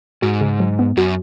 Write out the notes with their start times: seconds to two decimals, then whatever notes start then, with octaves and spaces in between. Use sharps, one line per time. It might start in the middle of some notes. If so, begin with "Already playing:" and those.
0.22 G#2 F#4
0.41 C#3
0.60 F#3
0.79 B3
0.97 F#2 F#4